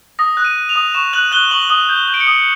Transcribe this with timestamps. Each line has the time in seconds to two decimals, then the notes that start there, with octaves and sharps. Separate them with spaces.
0.19 D#6 A#6
0.37 F#6
0.45 D#7
0.56 F#6
0.69 F7
0.76 D#6
0.94 C#6 E7
1.13 F#6 F#7
1.32 F#6 G7
1.51 C#6 F#7
1.62 F#7
1.70 D#6 G7
1.89 G6
1.96 G7
2.08 G6
2.14 D7
2.20 C#7
2.27 D#6